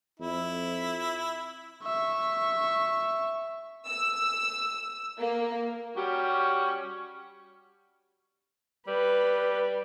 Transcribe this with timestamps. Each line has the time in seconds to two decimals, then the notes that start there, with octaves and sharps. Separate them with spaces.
0.20 F2 E4
1.83 E5 C#6
3.89 E6
5.19 A#3
5.97 G3 C#4 F#4 G4
8.87 G3 B4